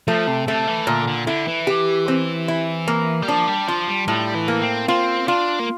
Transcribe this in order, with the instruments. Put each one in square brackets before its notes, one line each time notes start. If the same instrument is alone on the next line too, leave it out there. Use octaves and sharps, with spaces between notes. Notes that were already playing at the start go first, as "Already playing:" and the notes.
[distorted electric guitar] F3 [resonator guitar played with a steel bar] A3
[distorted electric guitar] C3
[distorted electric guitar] C3 [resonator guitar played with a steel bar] A3
[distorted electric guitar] E3
[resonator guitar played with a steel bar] A#2 [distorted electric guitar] D3
[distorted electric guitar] D3
[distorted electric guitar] D3 [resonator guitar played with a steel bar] E4
[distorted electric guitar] E3
[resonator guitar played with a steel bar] G4
C4
E4
A#3
[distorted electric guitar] G3
[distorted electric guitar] F3 [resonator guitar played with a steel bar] D4
[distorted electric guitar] G3
[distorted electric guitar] F3 [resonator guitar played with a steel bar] F4
[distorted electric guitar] G3
[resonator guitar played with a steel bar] A2 [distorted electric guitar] G3
[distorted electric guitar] E3
[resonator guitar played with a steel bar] A#3
[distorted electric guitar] C4
[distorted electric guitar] C4 [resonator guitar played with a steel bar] F4
[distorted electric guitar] D4 [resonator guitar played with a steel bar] F4
[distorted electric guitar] A#3